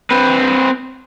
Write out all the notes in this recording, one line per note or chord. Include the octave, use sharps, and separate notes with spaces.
C4 B4